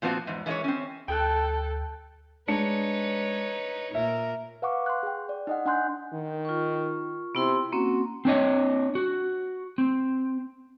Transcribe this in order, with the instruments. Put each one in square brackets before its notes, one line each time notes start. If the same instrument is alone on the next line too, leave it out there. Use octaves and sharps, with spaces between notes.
[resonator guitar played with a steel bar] A#2 F3 B3 C4 F#4 F5
E2 G#2
E3 G#3 A3 F4 A#4 C#5
C4 C#4
[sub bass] D2 [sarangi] A4 [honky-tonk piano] G5 F#6
[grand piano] G#3 D4 C#7 [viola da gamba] D#4 B4 C#5
[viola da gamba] A#2 A#4 [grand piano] E5
[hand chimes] B4 F5 F#5 C#6 D6
C6 F#6
G#4 G5
D5
D#4 D#5 F#5
D4 F#5 G#5 C6 F#6 G6
[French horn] D#3
[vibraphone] F4 C#6
[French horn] C3 [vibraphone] B3 E4 C6
[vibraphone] A#3 C4 C#4 [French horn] F#4
[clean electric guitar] C4 D4 C#5 D#5
F#4
C4